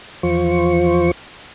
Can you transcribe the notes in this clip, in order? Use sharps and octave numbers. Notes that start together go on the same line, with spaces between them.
E2 F3 F4 C5 C#6